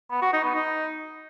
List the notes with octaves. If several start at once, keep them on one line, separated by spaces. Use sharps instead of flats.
B3
F#4
D#4
B3
D#4